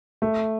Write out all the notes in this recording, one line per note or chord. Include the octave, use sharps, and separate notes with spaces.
A3